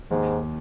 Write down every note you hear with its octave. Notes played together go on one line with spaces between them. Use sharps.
D#2 G#2